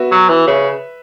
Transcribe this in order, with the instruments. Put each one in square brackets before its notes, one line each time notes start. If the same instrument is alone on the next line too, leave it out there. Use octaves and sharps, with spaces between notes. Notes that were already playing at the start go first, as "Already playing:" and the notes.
Already playing: [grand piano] B3 F#4 B4 E5
[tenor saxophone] F#3
E3
[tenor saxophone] C#3 [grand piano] B4 E5